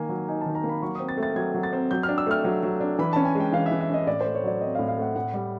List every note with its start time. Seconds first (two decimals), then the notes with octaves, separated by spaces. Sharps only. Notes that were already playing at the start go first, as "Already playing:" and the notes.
Already playing: D#3 A#3 G#5
0.09 F#3
0.28 D#4 G#5
0.41 D#3 A5
0.55 A#5
0.64 A#3
0.69 B5
0.82 F#3 C#6
0.95 C4 D#6
1.09 A6
1.18 A3
1.23 A6
1.36 F#3 G#6
1.54 F#3
1.63 A6
1.73 C4
1.91 F#3 G6
2.03 F6
2.09 D4
2.18 E6
2.27 A3 F6
2.44 F#3
2.63 F#3
2.81 D4
2.99 E3 B5
3.13 C#4 A5
3.25 G#5
3.35 G#3 G5
3.52 E3 F5
3.66 E5
3.71 E3
3.81 E5
3.89 C#4 D#5
4.07 A2 D5
4.21 C5
4.26 A3
4.35 C#5
4.44 F#3 D5
4.61 C4 D#5
4.75 A2 F5
4.88 F5
4.98 A3 F#5
5.15 A2 F#5
5.34 G3